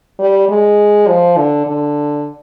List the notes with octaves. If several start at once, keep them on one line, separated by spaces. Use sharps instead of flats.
G3
G#3
F3
D3
D3